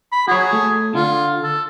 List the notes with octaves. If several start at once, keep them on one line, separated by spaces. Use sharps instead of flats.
B5
F#4 G#4 C#5
A3
D3 F4
A4